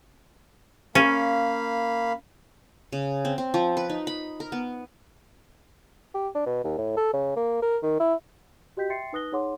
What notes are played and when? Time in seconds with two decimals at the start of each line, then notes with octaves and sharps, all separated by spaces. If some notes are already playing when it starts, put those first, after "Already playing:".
0.95 A#3 C#4 F5 B5
2.93 C#3
3.25 C4
3.38 C4
3.54 F3
3.77 B4
3.89 D#4
4.07 B5
4.40 A#4
4.52 B3
6.14 G4
6.35 D4
6.46 B2
6.64 D#2
6.78 A2
6.97 A4
7.13 C#3
7.36 A#3
7.62 A#4
7.83 D#3
8.00 E4
8.77 F#4 G4 D#5 G5 G6 B6
8.90 E5 G5 C6 A6 C7 C#7
9.13 D#4 B4 D#6 F#6 A#6 G7
9.32 D#4 G#4 C#5 F#5 C6 D6